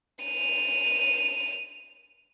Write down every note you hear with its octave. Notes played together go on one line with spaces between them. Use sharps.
D#7 F7